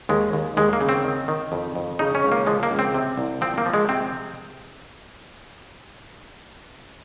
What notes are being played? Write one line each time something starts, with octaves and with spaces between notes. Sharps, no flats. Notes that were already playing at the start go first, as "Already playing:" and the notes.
D#2 G#3
D#2
D#2 G#3
A#3
C#3
C4
D#3
D#3
F2
F2
C#3 D#4
C#4
C#2
A#3
F3 G#3
A#3
C#2
C4
C3
C2
F3 C4
A#3
F3
G#3
C3 C4